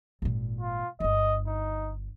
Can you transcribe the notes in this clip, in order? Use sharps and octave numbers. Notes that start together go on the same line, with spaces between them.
G#1 A#2
F4
G1 D3 D#5
D#4